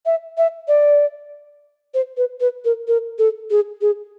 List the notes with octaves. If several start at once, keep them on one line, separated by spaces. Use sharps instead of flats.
E5
E5
D5
C5
B4
B4
A#4
A#4
A4
G#4
G#4